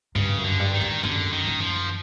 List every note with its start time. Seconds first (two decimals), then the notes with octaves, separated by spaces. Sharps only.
0.15 G2 C#3
0.37 F#2
0.44 D3
0.59 G2
0.74 D#3
0.81 G2
1.03 F#2 D3
1.32 D#3
1.47 F#2
1.61 F3